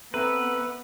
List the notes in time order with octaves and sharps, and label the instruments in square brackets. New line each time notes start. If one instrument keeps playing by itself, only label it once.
[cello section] B3 [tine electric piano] C4 A4 A#5 [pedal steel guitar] B4 [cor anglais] E5